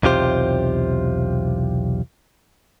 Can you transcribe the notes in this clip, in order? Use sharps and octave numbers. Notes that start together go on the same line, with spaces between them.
B1 E2 C3 F4 G4 C5